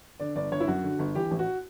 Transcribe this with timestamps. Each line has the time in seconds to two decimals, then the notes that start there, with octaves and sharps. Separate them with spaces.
0.20 D3 D5
0.36 G1 D5
0.52 G1 C#5
0.60 E4
0.67 F#2 F#4
0.84 D3
0.99 G1
1.15 E3 G4
1.31 A1
1.39 F#4